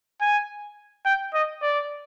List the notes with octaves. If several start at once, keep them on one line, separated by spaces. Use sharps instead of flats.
G#5
G5
D#5
D5